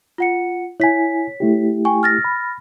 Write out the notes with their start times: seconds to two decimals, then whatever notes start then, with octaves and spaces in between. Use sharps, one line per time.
0.18 F4 F#5 C#7
0.80 E4 C#5 G#5 B6
1.40 A3 E4 G4
1.85 G5 G#5 C#6
2.03 F6 A6 A#6
2.24 B5